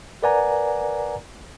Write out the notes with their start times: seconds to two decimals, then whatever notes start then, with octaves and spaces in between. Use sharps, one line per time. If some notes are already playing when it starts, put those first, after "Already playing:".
0.23 A#4 B4 D5 F#5 G#5 A#5